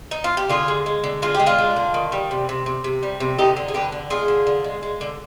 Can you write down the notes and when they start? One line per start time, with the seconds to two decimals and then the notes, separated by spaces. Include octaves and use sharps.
0.11 D#4
0.24 F4
0.37 G4
0.49 D3 F4 G#4
0.68 G#3
0.86 G#3
1.04 D3
1.22 G#3 F4
1.35 G4
1.40 G#3
1.46 D4 F4
1.59 G#3
1.76 D3
1.94 D#3
2.12 G3
2.31 C3
2.49 C3
2.66 C3
2.84 C3
3.03 G3
3.20 C3
3.38 D3 D#4 G4
3.57 D3
3.68 G#4
3.74 D3 G4 B4
3.92 D3
4.10 G#3 F4 G#4
4.28 D3
4.47 D3
4.64 G#3
4.83 G#3
5.01 D3